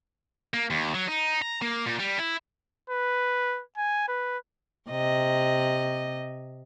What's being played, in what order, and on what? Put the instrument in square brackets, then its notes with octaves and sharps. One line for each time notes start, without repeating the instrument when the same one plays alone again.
[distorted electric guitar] A#3
D#2
F#3
D#4
A#5
A#3
A#2
G3
E4
[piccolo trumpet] B4
G#5
B4
[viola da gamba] C3 D#5